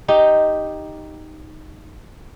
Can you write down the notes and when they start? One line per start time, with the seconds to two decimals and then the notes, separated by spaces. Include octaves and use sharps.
0.08 D#4 G4